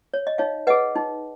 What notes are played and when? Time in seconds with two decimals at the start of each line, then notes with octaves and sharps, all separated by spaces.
0.14 C#5
0.27 D#5
0.38 D#4 C#5 F5
0.67 G#4 B4 D#5 F#5
0.96 D#4